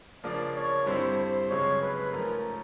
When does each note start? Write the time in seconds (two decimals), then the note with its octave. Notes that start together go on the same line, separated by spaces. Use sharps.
0.23 C#3 F3 A#3 D4 D5
0.56 C#5
0.86 G2 D3 G3 C4 E4 C5
1.18 C5
1.50 F#2 C#3 F3 G#3 C4 C#5
1.81 B4
2.12 G#2 F3 A3 C#4 A#4